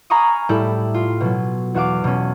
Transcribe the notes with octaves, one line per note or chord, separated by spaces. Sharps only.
F5 G#5 A#5 B5 C#6 D#6
A2 G3 E4 G4 A4
F4
B2 F#3
E2 F#4 F5 D6
B2 C#4